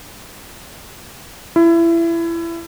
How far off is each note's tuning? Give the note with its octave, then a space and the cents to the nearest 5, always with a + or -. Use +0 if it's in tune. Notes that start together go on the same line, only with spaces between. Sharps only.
E4 +25